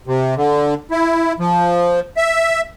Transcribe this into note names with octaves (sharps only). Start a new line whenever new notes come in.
C3
D3
E4
F3
E5